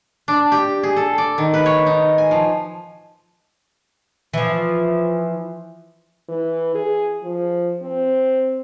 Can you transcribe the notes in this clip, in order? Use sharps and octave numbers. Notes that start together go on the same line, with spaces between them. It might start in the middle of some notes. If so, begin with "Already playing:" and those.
D4
G4
G#4
A4
D5
D#3
B4
C#5
D#4
G#5
F3
E3 F3
E3
G#4
F3
C4